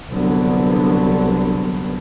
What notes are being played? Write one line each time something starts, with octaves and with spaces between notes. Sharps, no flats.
C2 D3 F#3 B3